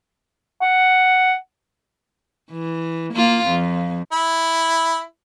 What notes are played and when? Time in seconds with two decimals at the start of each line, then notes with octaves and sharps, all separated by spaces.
0.62 F#5
2.51 E3
3.14 A#3 F4
3.47 F2
4.12 E4